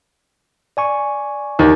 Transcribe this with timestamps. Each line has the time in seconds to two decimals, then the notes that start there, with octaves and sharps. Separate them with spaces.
0.77 D5 G#5 C#6
1.59 D#2